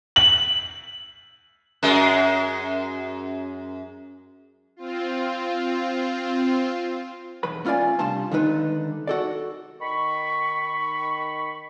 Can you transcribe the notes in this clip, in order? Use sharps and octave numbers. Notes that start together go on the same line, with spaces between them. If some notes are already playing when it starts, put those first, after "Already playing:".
F#7
F#2 G#3
C4 F4
B1 E2 B4 B5
A3 C#4 F4 G4 D5 G#5
C3 G3 D4 F5 A5 C6
D3 D#3 G#3 D#4 B4
F#4 A4 D5
D#3 B5 C#6